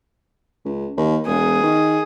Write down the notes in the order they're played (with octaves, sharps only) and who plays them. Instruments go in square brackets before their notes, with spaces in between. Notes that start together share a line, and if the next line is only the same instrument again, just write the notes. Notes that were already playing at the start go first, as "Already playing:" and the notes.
[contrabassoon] C#2
D#2
[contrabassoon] E1 [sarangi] G#4
[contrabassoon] D#3